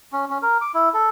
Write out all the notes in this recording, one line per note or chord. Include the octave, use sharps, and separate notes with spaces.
C#4
C#4
A#4
D6
E4
A4